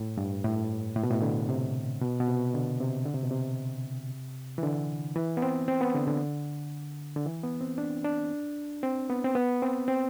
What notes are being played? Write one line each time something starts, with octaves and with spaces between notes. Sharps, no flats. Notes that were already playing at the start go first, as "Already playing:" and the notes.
Already playing: A2
G2
A2
A2
B2
A2
D3
C3
B2
B2
C3
D3
C3
D3
C3
B2
C3
E3
D3
E3
B3
C4
C4
B3
D3
D3
D3
E3
B3
C4
D4
D4
C4
B3
C4
B3
C4
C4